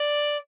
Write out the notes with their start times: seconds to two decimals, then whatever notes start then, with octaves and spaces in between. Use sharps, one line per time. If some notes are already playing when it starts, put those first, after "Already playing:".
Already playing: D5